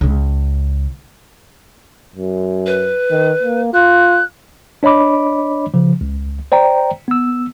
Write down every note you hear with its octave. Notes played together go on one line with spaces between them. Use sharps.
C#2 C#3
F#2
B4
D#3
A#3
F4 F#6
D4 C#5 D#5 B5 D6
C#3 F3
C#2
C5 D5 G5 A#5
B3 E6